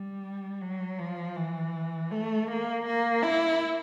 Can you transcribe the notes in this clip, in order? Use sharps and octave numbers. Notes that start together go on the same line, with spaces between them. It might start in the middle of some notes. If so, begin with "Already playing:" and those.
Already playing: G3
F#3
F3
E3
A3
A#3
A#3
E4